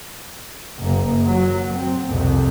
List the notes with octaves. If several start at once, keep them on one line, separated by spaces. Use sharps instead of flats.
F#1 A#3
F#3
C4
C2 F2